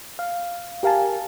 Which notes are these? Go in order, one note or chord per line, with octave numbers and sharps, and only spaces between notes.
F5
G4 A#4 F5 G#5 A5